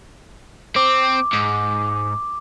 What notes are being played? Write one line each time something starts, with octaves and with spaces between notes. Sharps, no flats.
C4 D6
G#2